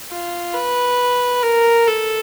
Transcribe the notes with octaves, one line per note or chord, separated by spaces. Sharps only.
F4
B4
A#4
A4